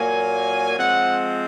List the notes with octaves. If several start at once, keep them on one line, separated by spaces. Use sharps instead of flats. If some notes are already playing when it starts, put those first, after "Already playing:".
Already playing: A#2 F#3 A#3 G#5
F3 G#3 C4 F#5